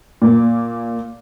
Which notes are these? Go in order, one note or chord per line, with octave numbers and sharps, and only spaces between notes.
A#2 A#3